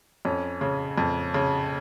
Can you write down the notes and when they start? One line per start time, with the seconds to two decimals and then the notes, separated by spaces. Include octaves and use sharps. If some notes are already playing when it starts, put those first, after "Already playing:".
0.25 F2 C#4
0.61 C#3
0.98 F2
1.34 C#3